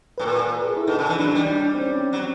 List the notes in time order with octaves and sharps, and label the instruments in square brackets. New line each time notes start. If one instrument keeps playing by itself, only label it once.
[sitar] A2 [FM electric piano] B4
[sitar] A#2 [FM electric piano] A#4
[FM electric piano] B4
B4
A#4
G#4
A4
E4
[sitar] B2 [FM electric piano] D#4
[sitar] C#3
E3
[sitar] F#3 [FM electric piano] D4
[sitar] G3 [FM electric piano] D#4
[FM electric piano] D4
C4
C#4
[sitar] F#3